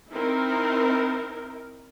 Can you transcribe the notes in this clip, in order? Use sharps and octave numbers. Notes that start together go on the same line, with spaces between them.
C4 D#4 E4 A#4